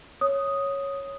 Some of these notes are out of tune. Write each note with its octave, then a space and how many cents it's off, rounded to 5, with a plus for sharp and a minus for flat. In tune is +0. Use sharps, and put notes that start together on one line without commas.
C#5 +0 D#6 +0